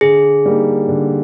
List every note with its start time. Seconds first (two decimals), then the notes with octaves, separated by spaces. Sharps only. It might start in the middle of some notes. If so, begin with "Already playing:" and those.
0.01 D3 G#4
0.46 G3 A#3 D#4
0.89 D3